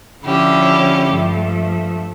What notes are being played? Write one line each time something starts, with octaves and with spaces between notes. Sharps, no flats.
D3 F3 C#4 E4 G4
G2 F3 A3